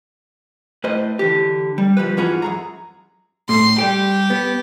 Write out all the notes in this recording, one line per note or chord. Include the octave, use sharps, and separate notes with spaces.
A2 B4 C5 D#5
D3 E3 G4
G3
C#2 F3 G3 B4
G#2 E3 F4 F#4 G#4 B5
F#2 G#4 A#5
A2 C6
G3 G4 G5
B3